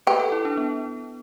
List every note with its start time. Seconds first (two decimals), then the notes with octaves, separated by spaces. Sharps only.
0.07 G4 B4
0.20 A4
0.32 E4
0.45 D4
0.57 B3